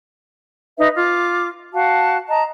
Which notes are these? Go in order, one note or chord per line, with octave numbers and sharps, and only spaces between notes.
D#4 B4 E5
F4 D6
F#4 F5 A5
D#5 A5 A#5